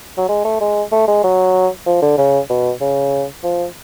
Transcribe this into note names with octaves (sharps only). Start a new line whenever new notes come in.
F#3
G#3
A3
G#3
A3
G#3
F#3
F3
D3
C#3
B2
C#3
F3